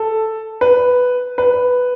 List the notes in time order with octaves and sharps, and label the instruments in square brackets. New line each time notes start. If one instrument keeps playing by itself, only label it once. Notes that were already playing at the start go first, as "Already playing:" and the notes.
Already playing: [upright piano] A4
B4
B4